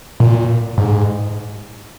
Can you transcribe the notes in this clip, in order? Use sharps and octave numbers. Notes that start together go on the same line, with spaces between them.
A#2
G#2